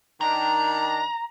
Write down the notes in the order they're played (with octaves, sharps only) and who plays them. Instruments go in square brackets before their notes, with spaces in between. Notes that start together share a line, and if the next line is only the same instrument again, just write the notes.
[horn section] D#3 D4 [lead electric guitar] A#5